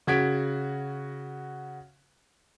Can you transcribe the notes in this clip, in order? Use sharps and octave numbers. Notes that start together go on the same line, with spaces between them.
C#3 F#4 G#6 B6 D7